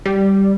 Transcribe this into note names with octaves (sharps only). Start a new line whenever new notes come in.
G3